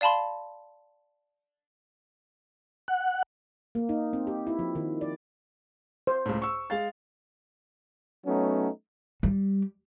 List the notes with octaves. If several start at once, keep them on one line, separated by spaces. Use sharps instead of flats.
D5 F5 A5 B5 C6
F#5
A#3
D#4
C4
G4
E4
F3
D#3
D5
C5
C#2 A2
C#6 E6
G#3 F5 A6
F#3 A3 B3 C#4 D#4
G3